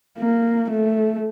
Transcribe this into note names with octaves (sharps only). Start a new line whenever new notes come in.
A#3
A3